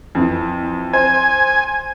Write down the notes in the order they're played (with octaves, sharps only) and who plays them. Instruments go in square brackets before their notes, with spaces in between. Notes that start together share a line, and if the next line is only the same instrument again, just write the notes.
[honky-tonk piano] F2 E3
[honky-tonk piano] C5 [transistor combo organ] G#5